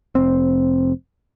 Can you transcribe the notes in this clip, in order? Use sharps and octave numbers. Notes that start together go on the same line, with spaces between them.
F1 C4